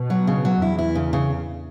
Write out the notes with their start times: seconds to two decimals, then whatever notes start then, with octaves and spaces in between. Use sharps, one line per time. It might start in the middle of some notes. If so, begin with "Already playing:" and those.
Already playing: B2
0.10 F#3
0.27 C#3
0.45 F#3
0.62 E2 E4
0.79 E4
0.95 C#3
1.13 C#3